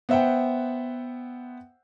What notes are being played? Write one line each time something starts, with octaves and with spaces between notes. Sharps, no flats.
B3 C5 E5 F#5 G5